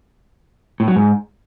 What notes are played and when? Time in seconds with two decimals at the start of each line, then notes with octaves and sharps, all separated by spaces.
0.80 A2
0.88 F#3
0.96 G#2